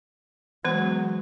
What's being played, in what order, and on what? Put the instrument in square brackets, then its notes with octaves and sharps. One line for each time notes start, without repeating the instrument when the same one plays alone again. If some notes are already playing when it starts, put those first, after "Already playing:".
[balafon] E3 B3 C5 [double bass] F#3 G#3